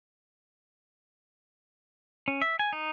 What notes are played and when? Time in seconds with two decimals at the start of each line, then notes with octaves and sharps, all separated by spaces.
2.28 C#4
2.42 E5
2.59 G#5
2.73 D#4